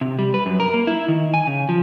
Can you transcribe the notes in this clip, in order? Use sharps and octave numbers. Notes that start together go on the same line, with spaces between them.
C3
G3
B4
F#2
A#4
A#3
E4
D#3
G#5
C#3
F3